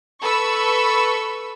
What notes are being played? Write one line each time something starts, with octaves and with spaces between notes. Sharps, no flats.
A4 B4 B5 C#6 E6